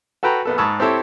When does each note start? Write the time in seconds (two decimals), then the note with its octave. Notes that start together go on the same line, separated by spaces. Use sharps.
0.23 F#4 A4 B4 G5 A#5 B5
0.45 A#1 B3 A4
0.58 G#2 A5 B5 C#6 D#6 E6
0.80 C4 E4 G4 A4 C#5